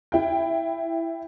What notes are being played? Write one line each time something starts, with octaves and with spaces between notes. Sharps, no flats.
E4 G5